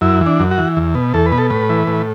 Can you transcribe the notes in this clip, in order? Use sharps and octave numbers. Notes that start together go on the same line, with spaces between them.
F#2 E4
E3
D4
F#2
F#4
E3
E2
B2
E2 A4
B4
B2
A4
A2 B4
E3
A2